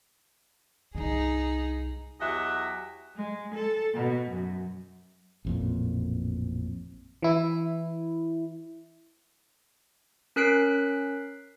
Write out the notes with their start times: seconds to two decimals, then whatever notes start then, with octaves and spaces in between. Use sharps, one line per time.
0.95 C2 G2 D#4 G#4
2.20 E2 F#3 G4 D#5 E5 F#5
3.16 G#3
3.54 A4
3.94 B2
4.30 F#2
5.45 A1 F2 A#2
7.22 E3 E4
10.36 C#4 A#4 F#6 B6 C7 D7